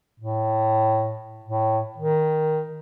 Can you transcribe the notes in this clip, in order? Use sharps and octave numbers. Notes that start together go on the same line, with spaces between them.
A2
A2
D#3